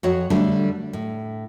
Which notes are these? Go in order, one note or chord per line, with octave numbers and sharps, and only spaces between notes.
F2 F#4 C#5
D3 G3 A3 D4
A2